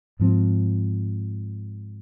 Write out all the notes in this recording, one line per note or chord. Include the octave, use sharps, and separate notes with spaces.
G#2 F3 C4